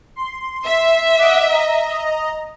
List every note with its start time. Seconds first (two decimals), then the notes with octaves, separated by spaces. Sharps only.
0.16 C6
0.66 E5
1.18 D#5 F#5 D6
1.48 D#5 A#5